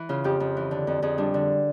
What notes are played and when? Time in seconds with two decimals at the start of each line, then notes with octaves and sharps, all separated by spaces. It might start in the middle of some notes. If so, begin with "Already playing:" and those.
Already playing: E3
0.09 C#3 F4
0.24 F2 G4
0.40 F2
0.57 E3
0.71 D3
0.87 F2
1.02 F2 G#4
1.18 G3 D4
1.34 D3